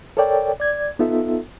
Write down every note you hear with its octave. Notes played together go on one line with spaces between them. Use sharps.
A4 A#4 C#5 D5 G5
D5 G#6
B3 D#4 F4 A4 E5